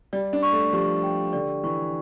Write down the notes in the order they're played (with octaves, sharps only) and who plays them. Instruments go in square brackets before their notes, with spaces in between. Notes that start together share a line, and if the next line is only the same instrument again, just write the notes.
[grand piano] G3 [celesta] D5
[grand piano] D4
[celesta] C#6
[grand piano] A3
[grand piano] F3 [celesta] G4
[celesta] G5
[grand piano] D3 [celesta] D5
[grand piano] E3 [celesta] C#6